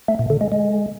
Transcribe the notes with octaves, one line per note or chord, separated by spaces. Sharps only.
A3
A#2
D3
G#3
G#3